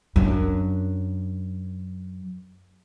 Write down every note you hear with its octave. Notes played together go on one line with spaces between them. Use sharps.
F#2 D4